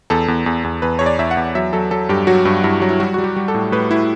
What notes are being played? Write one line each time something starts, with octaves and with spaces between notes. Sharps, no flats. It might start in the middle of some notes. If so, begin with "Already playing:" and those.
E2 A4
E2
E2
E2
E2 B4
E2 C#5
D5
E2 E5
F#5
E2
F#3 E5
F#3 A4
F#3 A4
G2 G4
F#3 F#4
G2
G2 E4
F#3
E4
G3 F#4
G3 F#4
G4
G3
A4
A2
A2 B4
A2 E4